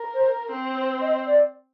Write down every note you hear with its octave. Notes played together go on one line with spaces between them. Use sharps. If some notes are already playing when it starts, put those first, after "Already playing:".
Already playing: A#4
C5
C4
C5
D#5
D5